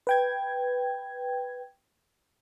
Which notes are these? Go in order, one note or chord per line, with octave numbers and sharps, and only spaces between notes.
B4 G5 G#6